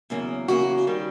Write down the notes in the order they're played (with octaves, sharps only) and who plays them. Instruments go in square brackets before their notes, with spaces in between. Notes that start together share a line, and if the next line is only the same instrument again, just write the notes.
[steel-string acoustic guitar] E2 C#3 F#3 A#3
E2 C#3 F#3 A#3 F#4
D#3 G3